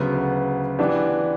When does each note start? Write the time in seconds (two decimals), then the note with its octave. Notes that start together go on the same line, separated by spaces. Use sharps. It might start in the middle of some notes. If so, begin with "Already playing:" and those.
Already playing: D2 C#3 F#3 B3
0.79 E3 B3 D4 G4